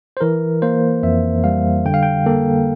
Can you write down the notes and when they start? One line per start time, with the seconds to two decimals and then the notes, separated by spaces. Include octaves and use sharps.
0.17 C5
0.21 E3 A#4
0.62 A#3 C5
1.03 F2 E5
1.44 G3 F5
1.85 D3 G5
1.94 F5
2.03 G5
2.26 A#3 A4